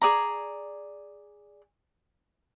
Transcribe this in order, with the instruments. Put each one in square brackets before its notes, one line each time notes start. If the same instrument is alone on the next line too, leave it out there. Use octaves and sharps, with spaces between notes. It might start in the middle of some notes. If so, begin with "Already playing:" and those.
[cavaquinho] G#4 D5 A#5